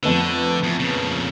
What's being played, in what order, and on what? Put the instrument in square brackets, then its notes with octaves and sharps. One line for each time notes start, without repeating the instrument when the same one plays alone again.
[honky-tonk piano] F2 A3 B3 [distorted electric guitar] D3
[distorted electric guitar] E2
A#2 C#3